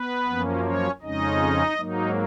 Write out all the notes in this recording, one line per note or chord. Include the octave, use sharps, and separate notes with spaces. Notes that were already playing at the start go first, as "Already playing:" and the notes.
Already playing: B3 B4
F#2 F3 A#3 C#4
C#4 C#5
F2 C#3 G#3 C#4 D#4 D#5
G#2 F#3 A#3 D#4